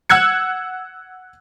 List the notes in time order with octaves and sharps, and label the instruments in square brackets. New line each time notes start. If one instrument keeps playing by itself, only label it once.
[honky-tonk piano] F#5 E6 F#6 G#6 C#7